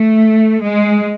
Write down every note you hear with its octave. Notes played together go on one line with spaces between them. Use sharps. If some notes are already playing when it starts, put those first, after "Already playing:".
Already playing: A3
G#3